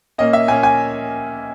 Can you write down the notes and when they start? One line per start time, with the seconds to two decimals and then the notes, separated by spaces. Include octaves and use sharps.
0.18 A#2 A#3 C#4 D#5
0.33 E5
0.48 A#2 A#3 C#4 G#5
0.63 G#5